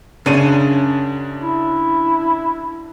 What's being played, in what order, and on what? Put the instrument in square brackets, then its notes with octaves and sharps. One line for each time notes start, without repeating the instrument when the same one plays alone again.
[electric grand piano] F#2 D4 D#7 [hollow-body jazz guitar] C#3
[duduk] E4